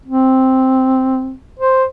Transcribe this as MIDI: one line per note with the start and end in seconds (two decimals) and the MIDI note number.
0.06 1.34 60
1.59 1.85 72